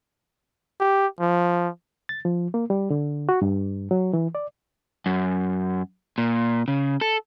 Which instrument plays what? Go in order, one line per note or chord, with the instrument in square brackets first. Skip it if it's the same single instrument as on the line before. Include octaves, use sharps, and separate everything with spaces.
[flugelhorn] G4
F3
[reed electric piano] A6
F3
A#3
G3
D3
F#4
G2
F#3
E3
D5
[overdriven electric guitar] F#2
A#2
C#3
A4